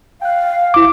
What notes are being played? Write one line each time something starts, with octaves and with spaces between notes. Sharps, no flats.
F5 G5 F#6
G#1 E4 D6